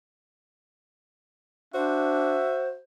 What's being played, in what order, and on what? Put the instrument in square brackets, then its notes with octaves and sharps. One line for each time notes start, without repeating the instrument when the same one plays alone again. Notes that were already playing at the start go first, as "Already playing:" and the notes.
[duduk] D4 [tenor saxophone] F#4 [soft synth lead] C5 [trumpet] E5